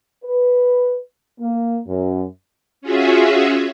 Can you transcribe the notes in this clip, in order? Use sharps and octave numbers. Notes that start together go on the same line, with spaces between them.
B4
A#3
F#2
C#4 F4 F#4 G#4 E5